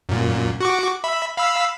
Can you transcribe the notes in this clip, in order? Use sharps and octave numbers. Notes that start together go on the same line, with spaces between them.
F#2 A#2
F#4 C#6 D6
E5 B5
F5 B5 E6